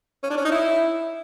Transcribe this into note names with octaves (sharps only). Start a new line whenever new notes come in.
C#4
D4
C#4
D#4
E4